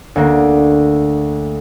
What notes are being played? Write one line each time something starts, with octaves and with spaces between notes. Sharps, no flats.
D2 A#3